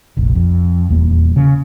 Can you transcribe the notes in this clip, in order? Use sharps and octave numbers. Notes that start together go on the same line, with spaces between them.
F1 A#1
F2
D#1 E2 A#3
C#3